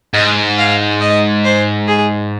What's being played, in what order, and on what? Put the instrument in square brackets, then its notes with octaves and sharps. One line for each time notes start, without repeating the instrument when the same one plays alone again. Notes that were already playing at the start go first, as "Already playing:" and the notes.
[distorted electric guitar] G#2 [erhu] D#5
[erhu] F5
D#5
C5
G#4